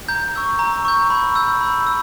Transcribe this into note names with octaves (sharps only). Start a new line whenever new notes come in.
A#5 G6
C#6 E6 G6
A#5
C#6 E6 G6
B5
E6 G6
B5
E6